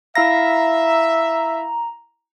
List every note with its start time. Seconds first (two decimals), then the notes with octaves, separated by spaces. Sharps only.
0.15 E4 E5 F5 A#5 A#6